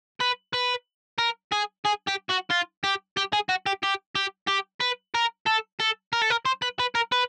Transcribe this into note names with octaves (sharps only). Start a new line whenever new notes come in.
B4
B4
A#4
G#4
G#4
G4
F#4
F4
G4
G4
G#4
F#4
G4
G4
G4
G4
B4
A#4
A4
A4
A#4
A4
A#4
C5
B4
B4
A#4
B4